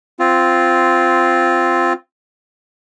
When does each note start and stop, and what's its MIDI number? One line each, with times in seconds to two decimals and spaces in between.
0.19 1.93 60
0.19 1.93 65